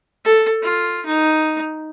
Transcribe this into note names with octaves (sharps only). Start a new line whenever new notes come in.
A4
F4
D#4